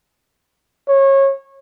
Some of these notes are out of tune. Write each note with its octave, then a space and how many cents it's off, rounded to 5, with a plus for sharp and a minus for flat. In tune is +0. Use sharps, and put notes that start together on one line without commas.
C#5 -25